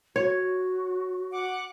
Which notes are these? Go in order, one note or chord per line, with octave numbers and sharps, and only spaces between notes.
F#4 C#5
F#5 D6